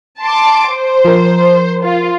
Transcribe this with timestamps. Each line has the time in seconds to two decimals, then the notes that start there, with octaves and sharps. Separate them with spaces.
0.21 A5 C6 D6
0.70 C5
1.05 F3 A#4
1.84 F4